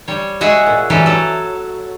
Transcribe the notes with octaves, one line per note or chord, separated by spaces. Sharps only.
G3 C#5
G#3 F#4 G#4 E5 F#5
A#2
E3 F#3 G3 G4 A4
F#3 A4